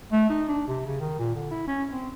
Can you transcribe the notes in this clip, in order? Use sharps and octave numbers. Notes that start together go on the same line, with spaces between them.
A3
D#4
D4
C3
C#3
D#3
A#2
D3
E4
C#4
C4